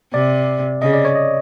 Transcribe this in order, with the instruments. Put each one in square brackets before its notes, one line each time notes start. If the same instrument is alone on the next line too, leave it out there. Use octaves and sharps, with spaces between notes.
[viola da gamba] C3 [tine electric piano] D5
[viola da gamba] C#3 [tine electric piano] D#5
[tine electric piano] D5
C#5
D#5